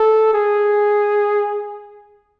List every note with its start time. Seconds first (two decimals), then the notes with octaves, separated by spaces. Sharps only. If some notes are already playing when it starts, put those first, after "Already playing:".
Already playing: A4
0.33 G#4